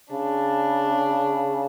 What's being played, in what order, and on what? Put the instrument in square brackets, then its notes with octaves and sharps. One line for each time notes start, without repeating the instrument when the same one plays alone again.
[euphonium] C#3 [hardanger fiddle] D4